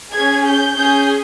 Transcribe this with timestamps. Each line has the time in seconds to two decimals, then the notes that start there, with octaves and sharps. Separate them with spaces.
0.13 C#4 G#4 G#6
0.45 G6
0.76 C#4 G#4 G6